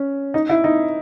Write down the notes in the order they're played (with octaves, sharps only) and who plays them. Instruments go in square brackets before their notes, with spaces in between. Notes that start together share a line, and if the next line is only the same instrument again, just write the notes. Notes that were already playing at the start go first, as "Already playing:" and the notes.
Already playing: [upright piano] C#4
D#4
E4
D#4